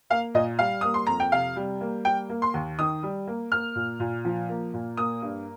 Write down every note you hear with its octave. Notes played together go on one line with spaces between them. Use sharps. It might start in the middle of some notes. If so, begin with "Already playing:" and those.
A#3 F5
A#2 D#5
G3 F5
A#3 D#6
C6
F2 A#5
G5
C3 F5
G3
A#3
G3 G5
A#3
C6
D#2
D#3 D#6
G3
A#3
A#3 F6
A#2
A#2
F3
A#3
A#2
A#3 D#6
G2